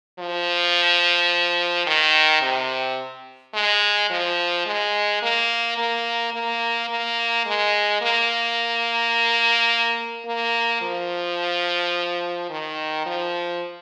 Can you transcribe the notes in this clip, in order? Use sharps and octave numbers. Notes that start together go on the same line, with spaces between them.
F3
D#3
C3
G#3
F3
G#3
A#3
A#3
A#3
A#3
G#3
A#3
A#3
F3
D#3
F3